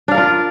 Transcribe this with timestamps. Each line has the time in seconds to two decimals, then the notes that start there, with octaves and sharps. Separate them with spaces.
0.08 D4
0.11 F5
0.14 A#4
0.18 F4